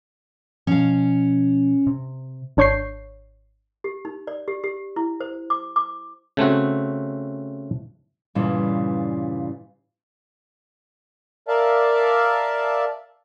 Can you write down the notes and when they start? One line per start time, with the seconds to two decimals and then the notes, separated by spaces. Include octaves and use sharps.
0.67 B2 F3 C#4 F5
1.87 C3
2.57 G#1 D4 C#5 C#6 G6 C7
3.84 G4
4.05 D#4
4.27 D5
4.48 G4
4.64 G4
4.96 E4
5.20 C5
5.50 D6
5.76 D6
6.37 C#3 A3 C4 F#4
8.35 G2 A#2 C#3 E3 G3 F4
11.48 A#4 D5 E5 F5 A5